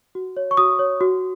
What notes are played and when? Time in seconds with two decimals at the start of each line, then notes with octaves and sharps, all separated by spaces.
0.15 F#4
0.37 C#5
0.51 C#6
0.57 F#4 D#6
0.79 C#5
1.01 F#4